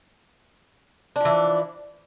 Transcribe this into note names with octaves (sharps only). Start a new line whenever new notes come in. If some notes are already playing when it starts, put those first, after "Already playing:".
E3 F3 D4